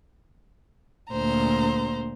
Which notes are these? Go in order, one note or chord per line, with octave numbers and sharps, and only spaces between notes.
D2 A#2 C5 A#5